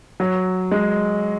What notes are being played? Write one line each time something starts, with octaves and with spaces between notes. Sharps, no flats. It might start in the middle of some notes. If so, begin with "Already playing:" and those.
F#3
G#3